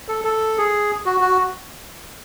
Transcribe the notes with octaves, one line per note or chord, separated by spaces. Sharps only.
A4
A4
G#4
F#4
F#4